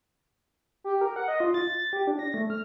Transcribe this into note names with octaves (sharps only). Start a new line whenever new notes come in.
G4
A#4
F#5
D#5
F4
A6
A6
G4
D4
A#6
A3
F6